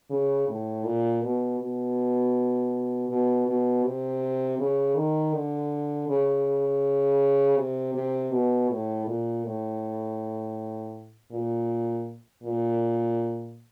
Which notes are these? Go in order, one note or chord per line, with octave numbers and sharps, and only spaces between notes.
C#3
A2
A#2
B2
B2
B2
B2
C3
C#3
D#3
D3
C#3
C3
C3
B2
A2
A#2
A2
A#2
A#2